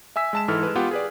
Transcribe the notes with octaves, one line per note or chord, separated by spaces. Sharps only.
E5 G#5 E6 B6
G#3 A5 E7
G#2 E3 A4 F6
G#3 B4
B3 F4 G4 B4 F#5
G#4 B4 D5